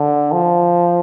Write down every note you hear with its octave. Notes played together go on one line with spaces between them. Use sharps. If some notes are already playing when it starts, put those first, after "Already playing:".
Already playing: D3
F3